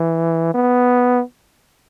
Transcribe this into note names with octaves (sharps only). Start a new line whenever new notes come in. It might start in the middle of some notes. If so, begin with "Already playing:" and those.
Already playing: E3
B3